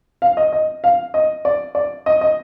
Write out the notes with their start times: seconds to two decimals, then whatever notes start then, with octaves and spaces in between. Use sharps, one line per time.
0.22 F5
0.37 D#5
0.52 D#5
0.84 F5
1.14 D#5
1.45 D5
1.75 D5
2.06 D#5
2.21 D#5